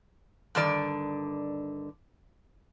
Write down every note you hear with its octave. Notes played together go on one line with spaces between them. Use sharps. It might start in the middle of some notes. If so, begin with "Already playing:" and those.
G2 D3 D#3 D5